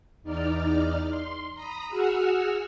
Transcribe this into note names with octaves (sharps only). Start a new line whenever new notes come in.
E2 D#4 D5 F6
C6
A#5 B5 D#6
F#4 G#4 F#5 E6 F6